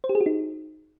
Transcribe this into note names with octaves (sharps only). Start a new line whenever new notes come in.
C5
G4
G#4
F#4
D#4